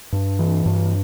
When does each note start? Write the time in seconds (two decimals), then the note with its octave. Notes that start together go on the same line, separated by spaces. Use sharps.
0.12 G2
0.39 E3
0.66 G2